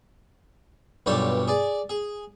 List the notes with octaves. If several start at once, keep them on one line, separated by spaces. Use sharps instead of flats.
B1 G2 A#2 G4 A4 C#5
G#4 D5
G#4